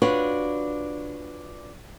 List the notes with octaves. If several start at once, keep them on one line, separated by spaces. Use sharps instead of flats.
D4 F4 F#4 B4 C#5